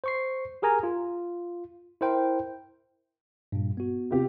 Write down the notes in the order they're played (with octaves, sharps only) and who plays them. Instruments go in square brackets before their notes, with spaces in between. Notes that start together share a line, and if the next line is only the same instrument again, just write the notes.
[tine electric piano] C5 C#6 C7
G4 G#4 A#4 G#5 A#5
F4
E4 A#4 C5 G5
G2 A#2
B3 F#4
[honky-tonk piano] C3 F4 G4